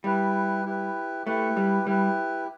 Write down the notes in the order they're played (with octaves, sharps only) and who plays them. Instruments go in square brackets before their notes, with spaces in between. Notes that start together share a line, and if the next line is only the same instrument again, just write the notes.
[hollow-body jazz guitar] G3 [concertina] E4 G4 B4
[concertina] E4 G4 B4
[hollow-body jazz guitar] A3 [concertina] E4 G4 B4
[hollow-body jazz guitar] G3
[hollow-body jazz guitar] G3 [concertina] E4 G4 B4